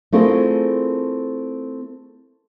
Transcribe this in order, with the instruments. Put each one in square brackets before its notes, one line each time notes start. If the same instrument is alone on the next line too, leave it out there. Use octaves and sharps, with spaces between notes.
[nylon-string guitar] A3 C4 E4 F4 G#4 A#4